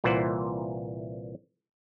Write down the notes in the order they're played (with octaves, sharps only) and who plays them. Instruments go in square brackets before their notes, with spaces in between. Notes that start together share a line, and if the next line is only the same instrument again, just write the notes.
[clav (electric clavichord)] C2 A#2 E3 F4 C5 F#5